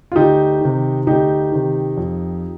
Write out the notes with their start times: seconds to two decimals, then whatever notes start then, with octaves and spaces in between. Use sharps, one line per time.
0.12 F4
0.16 D2 D#4 G4
0.61 C3 D#3
1.06 D2 D#4 G4
1.52 C3 D#3
1.97 F2